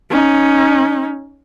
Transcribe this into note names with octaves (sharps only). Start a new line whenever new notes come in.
C#4 D#4